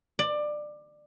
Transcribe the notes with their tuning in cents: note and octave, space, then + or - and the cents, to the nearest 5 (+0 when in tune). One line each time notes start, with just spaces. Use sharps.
D5 +20